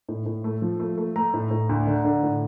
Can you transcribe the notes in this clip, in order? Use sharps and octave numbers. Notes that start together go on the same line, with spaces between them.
A2
A2
A3
F3
A3
A3
A3 A#5
A2
A2
D2
D3
D3
A2